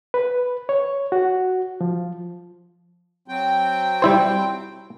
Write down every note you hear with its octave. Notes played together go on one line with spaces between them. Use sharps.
B4
C#5
F#4
F3
F#3 C4 G5
G3 E4 C5